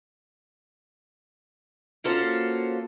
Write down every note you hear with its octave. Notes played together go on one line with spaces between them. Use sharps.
A#3 C#4 F4 F#4 A4 C5